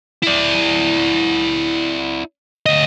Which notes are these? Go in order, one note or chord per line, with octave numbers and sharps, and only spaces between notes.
E4 D5
D2 D#5